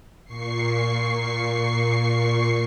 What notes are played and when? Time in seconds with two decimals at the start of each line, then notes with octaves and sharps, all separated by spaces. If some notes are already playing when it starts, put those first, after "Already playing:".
0.24 A#2 C#6 C7